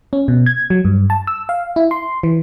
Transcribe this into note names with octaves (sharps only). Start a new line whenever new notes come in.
C#4
B2
G#6
F#3
G2
A5
E6
F5
E4
C6
E3